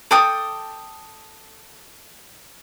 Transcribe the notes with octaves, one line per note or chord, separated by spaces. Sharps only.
A4 G5 D6 D#6